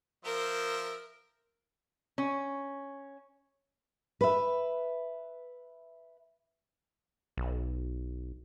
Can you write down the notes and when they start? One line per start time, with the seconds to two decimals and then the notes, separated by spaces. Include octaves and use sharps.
0.25 F3 A#4 C5 E5
2.18 C#4
4.21 B4 E5
7.37 B1